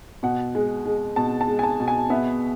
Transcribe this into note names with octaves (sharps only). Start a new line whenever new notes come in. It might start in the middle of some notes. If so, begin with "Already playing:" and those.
B2 F#5
G#3
G#3
B2 A5
A5
G#3
G#5
A5
B2
G#5
B3 E5